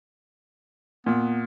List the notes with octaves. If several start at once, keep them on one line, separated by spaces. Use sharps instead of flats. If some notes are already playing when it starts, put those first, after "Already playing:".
A#2 B3